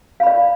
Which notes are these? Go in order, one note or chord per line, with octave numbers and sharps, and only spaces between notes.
D5 F5 B5